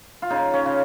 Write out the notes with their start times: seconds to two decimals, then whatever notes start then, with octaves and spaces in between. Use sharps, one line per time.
0.22 F4
0.30 C#3 D#4
0.53 C#4
0.66 C#3